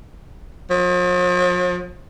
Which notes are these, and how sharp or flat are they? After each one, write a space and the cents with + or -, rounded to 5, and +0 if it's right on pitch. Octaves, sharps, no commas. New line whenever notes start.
F3 +45